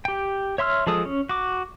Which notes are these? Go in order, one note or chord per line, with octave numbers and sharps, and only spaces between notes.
G4 G5
C#5 E5 C6 E6 F6
F3 G#3 G#4 A4 D#6
C#4
F#4 D6